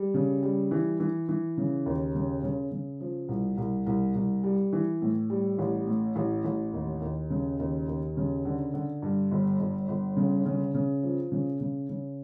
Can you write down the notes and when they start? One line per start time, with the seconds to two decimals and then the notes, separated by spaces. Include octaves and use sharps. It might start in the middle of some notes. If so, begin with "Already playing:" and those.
Already playing: G3
0.14 C#3
0.43 G3
0.71 E3
1.00 E3
1.29 E3
1.57 C#3
1.86 D#2
2.15 C#3
2.43 C#3
2.71 C#3
3.00 F3
3.29 C2
3.58 C2
3.87 C2
4.15 C2
4.44 G3
4.73 E3
5.02 A2
5.30 G3
5.59 A1
5.87 A2
6.16 A1
6.45 A1
6.73 D#2
7.02 D#2
7.30 C#3
7.59 D#2
7.88 D#2
8.17 C#3
8.45 D3
8.74 D3
9.02 G2
9.31 G1
9.60 G1
9.88 G1
10.17 C#3
10.46 C#3
10.74 C#3
11.03 F3
11.32 C#3
11.60 C#3
11.89 C#3